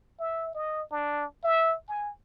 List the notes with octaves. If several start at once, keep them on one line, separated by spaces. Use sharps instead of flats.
E5
D#5
D4
E5
G#5